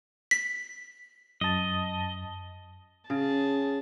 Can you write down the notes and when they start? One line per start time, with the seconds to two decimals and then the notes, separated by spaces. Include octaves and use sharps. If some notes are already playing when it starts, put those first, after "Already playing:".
0.31 B6
1.41 F#2 D#5 A5
3.10 C#3 G#4 A5